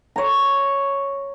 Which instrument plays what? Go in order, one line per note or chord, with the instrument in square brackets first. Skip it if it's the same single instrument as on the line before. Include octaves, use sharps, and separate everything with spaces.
[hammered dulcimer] C#5 A#5